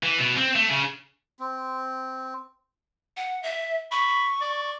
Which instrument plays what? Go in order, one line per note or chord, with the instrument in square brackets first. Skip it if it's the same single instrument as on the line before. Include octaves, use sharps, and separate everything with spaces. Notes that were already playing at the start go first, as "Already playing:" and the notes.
[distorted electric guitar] E3
B2
C4
A3
C#3
[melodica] C4
[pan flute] F#5
E5
[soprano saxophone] B5 [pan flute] C#6
[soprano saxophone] D5